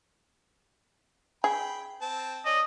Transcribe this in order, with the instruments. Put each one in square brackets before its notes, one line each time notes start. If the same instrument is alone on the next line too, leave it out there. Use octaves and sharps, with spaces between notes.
[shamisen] G#4 [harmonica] G5 B5
[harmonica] C4 A5
[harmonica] C#4 D5 [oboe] D#5